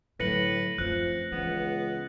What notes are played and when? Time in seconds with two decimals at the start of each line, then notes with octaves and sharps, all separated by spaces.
0.20 A2 D3 F#3 B4 A#6 C#7 F#7
0.78 F#2 F3 A3 C4 F#6
1.32 C#2 E3 B3